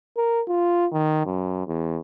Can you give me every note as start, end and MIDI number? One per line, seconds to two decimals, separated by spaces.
0.17 0.42 70
0.48 0.86 65
0.93 1.24 51
1.26 1.64 42
1.67 1.99 40